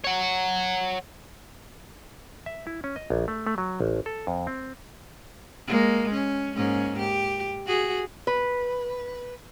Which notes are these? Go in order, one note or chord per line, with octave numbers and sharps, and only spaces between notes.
C#5 F#5
E5
E4
C#4
D#5
A#1
A3
A3
F#3
A1
A4
F2
C4
G#3 A#3
C#4
G#2 A#3 C#4
G4
F#4 G#4
B4